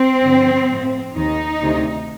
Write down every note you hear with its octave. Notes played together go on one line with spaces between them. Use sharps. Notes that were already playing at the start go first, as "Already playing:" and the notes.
Already playing: C4
G2 D3 F3
A2 F3
D#2 D#3 D#4
D2 C3 D#3